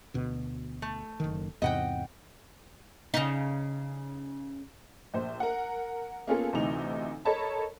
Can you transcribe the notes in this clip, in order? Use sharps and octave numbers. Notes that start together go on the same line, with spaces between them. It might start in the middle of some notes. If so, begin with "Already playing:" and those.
D2 B2
A3
F#1 D#3
E2 G#2 C3 D#5 F#5 G5
C#3 D#4
A#1 C5
A#4 F#5
A#3 B3 C#4 F4 G#4 A4
D2 C3 E3 D#4 F7
A4 A#4 C#5 D#5 A5 B5